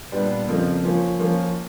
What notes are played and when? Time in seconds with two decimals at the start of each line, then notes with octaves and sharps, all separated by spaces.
0.12 A#2 G3 B3 D4 G4
0.48 F2 C#3 F3 A#3
0.83 F3 A#3 C#4 F4
1.19 F3 A#3 C#4 F4